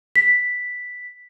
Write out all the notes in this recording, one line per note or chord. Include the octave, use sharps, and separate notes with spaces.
B6